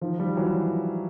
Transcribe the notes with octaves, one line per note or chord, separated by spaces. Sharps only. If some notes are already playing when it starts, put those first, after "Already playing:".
D#3 F3
F3 G3
E3 F#3